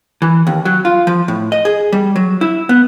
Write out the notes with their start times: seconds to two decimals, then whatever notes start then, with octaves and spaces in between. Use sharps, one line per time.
0.22 E3
0.47 D#2
0.65 F#3
0.85 F4
1.07 F3
1.28 A2
1.52 D#5
1.65 G#4
1.93 G3
2.16 F#3
2.41 E4
2.69 B3